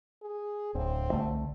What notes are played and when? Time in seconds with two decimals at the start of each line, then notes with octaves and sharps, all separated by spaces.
0.22 G#4
0.75 D1 C4
1.12 C2 D3 A3